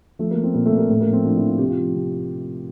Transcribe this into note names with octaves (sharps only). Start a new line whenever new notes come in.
F3 A3
A#3
F3
C4
A#2 A#3
A3
A#2
A#3
A2 A3
A#3
F3
C4
F3 D4
E4
F3
F4
C3 G4
F4
F3
C3